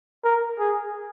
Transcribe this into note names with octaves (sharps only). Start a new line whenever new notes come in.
A#4
G#4